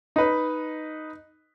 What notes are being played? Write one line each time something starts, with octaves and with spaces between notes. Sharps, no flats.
D#4 B4